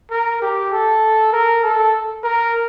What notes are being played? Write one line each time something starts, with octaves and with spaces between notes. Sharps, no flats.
A#4
G4
A4
A#4
A4
A#4